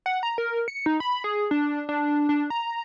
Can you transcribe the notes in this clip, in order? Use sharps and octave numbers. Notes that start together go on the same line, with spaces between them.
F#5
A#5
A#4
C#7
D#4
B5
G#4
D4
D4
D4
A#5